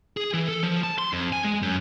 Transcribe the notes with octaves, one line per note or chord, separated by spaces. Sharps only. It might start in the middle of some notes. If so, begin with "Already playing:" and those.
G#4
E3
A4
F3
A5
C6
F2
G#5
G#3
F#2